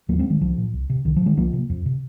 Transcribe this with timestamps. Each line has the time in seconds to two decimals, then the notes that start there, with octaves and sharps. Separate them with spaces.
0.09 D#2 F3 A#3
0.19 G#3 C4
0.30 D#3 G#3
0.41 C2 F3
0.58 A#2
0.73 C2
0.90 C3
1.05 C2 D#3
1.16 F3
1.21 C3
1.26 D#3 G#3
1.37 C2 F3 A#3
1.53 C3
1.70 F2
1.86 C3